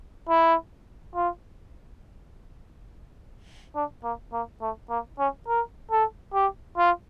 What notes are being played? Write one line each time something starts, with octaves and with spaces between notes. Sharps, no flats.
E4
F4
D4
A#3
A#3
A3
A#3
C#4
A#4
A4
G4
F4